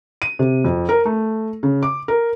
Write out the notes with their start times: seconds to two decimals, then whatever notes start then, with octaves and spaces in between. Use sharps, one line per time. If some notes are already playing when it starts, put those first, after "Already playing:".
0.22 D#7
0.39 C3
0.65 F2
0.89 A#4
1.05 A3
1.63 C#3
1.83 D6
2.08 A#4